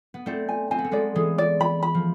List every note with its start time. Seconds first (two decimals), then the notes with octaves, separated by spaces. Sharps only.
0.14 B3
0.26 A3 C4 D5
0.49 G#5
0.71 C4 G#5
0.78 B3
0.84 A3
0.91 G#3 B3 D5
1.15 E3 G#3 G#4
1.38 D5
1.61 B5
1.83 B5
1.95 F3